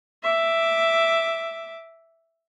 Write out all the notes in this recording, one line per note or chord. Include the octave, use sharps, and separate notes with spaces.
E5 D6